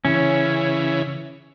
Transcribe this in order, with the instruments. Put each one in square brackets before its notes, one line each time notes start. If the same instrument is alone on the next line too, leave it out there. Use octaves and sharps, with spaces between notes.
[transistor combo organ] C#3 E3 [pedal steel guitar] C#4